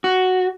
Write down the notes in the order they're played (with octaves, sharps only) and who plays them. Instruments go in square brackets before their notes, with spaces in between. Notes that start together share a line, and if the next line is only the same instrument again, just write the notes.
[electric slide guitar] F#4